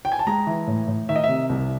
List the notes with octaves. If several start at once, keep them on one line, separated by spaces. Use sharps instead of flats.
G5
G#5
A5
G#3 A#5
E3
A2
A2
D#3 E5
D#5
C3 E5
C2